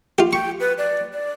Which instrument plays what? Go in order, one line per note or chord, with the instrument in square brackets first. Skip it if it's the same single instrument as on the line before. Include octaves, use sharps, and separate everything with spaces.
[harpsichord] F4 G4
[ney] G5 [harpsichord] C#6
[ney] B4
D5
D5